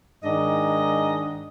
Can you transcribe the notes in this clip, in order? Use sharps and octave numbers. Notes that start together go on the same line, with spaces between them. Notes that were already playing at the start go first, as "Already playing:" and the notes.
G#2 D#3 D4 D#5